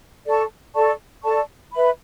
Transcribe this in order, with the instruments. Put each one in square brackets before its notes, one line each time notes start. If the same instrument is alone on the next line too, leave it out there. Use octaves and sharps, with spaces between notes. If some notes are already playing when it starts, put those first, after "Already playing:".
[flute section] A4 D5 A5 C#6
A4 D5 A5 C#6
A4 D5 A5 C#6
B4 E5 B5